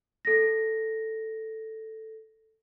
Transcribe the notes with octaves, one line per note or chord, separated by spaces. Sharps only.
A4 A#6